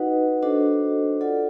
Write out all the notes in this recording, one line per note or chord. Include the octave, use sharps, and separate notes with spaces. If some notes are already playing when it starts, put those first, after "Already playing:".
Already playing: D#4 F#4 B4 D#5 F#5
D4 F#4 A4 C5 D#5
F4 A4 D5 F#5